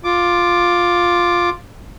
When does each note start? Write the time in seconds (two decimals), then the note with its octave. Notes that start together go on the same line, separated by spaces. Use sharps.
0.04 F4 D6